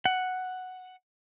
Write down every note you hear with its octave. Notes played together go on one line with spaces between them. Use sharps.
F#5